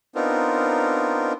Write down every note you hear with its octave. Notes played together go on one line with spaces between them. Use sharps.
B3 C4 D4 D#4 F4 A#4